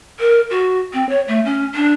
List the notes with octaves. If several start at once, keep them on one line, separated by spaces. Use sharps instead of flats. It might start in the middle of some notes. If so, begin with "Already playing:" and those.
A#4
F#4
C4
C#5
A3
C#4
D4